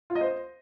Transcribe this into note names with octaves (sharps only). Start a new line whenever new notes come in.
F4
D#5
C5